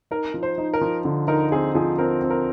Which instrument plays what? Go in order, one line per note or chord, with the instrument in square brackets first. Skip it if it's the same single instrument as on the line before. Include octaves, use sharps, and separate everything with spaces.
[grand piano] D#4 [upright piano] A#4
[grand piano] F3
[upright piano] C5
[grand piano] D#4
[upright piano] A#4
[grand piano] F3
D3
[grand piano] D#4 [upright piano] A#4
[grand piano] C4 [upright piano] G#4
[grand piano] F3 [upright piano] G#4
[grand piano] C4 [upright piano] A#4
[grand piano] C4
[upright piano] A#4